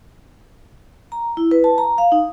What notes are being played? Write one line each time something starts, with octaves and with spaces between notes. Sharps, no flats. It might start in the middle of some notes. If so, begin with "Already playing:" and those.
A#5
E4
B4
A5
A#5
F5
D#4